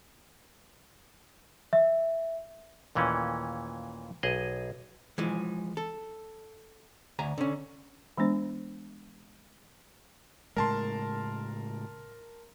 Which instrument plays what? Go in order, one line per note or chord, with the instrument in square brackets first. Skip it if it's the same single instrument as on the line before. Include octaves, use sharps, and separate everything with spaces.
[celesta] E5
[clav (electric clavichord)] D#2 A#2 E3 A3 C#4
B1 G#4 D#5
[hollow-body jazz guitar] E3 F3 G#3
A4
D2 G#5 A#5
D3 C#4
[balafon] E3 G#3 B3 D4 C5
[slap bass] A2 C#3 G#3 [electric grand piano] A#4 A5 C6